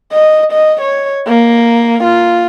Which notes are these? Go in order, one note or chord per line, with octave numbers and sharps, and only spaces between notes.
D#5
D#5
C#5
A#3
F4